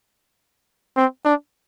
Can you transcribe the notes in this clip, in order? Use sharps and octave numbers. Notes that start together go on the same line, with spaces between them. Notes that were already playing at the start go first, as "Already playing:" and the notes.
C4
D4